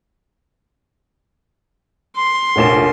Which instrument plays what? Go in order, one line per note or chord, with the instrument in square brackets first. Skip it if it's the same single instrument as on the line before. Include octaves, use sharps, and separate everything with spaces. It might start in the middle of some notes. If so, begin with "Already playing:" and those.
[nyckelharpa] C6
[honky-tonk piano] F1 A#1 E7 [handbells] A#4 C#5 F#5